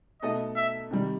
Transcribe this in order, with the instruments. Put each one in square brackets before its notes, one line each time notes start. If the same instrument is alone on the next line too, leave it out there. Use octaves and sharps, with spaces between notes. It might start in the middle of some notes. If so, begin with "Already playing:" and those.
[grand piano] B2 A3 D#4 A4 E5 [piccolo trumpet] D#5
[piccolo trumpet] E5
[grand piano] C3 D#3 G3